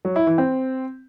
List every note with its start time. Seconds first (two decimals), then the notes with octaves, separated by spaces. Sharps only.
0.05 F#3
0.16 E4
0.27 E3
0.38 C4